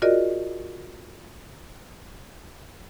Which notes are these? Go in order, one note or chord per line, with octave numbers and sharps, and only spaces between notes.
F4 F#4 G#4 A#4 D5 D#5